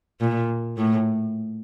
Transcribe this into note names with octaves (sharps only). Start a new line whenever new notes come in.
A#2
A2